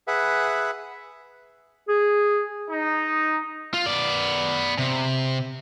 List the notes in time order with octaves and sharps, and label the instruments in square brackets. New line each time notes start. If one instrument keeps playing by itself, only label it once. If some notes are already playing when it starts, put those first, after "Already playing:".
[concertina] G#4 B4 E5 F#5
[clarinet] G#4
[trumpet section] D#4
[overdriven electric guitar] F4
B3 D5
C3